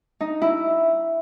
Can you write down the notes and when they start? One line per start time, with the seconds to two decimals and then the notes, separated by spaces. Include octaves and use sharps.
0.20 D#4
0.42 E4